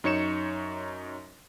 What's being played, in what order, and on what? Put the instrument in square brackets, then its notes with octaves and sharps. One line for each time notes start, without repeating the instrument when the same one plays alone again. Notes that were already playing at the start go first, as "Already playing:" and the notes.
[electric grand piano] F#2 D#4 C#5 C#7 E7